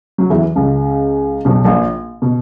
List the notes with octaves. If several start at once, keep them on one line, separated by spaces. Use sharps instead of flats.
F#3
E2 E3
C#2 C#3
B1 B2
A#1 A#2
B2